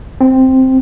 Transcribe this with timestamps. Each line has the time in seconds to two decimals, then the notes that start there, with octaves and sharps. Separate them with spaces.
0.21 C4